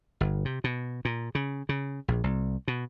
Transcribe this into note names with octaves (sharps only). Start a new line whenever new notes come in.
G1
C3
B2
A#2
C#3
C#3
A#1
C2
B2